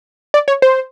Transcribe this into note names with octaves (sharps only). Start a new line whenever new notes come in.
D5
C#5
C5